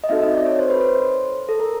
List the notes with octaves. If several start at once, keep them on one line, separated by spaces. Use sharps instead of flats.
D#5
C4 D#4 F#4 A4 E5
D#5
D5
C#5
C5
B4
C5
A4
A#4